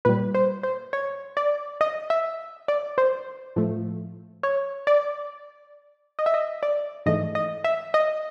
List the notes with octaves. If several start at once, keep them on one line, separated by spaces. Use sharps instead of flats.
A#2 G3 B4
C5
C5
C#5
D5
D#5
E5
D5
C5
A2 F3 A3
C#5
D5
D#5
E5
D#5
D5
G#2 E3 A3 D#5
D#5
E5
D#5